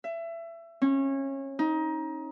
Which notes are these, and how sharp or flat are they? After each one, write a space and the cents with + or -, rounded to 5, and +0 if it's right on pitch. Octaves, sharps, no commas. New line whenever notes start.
E5 +25
C#4 -25
D#4 +20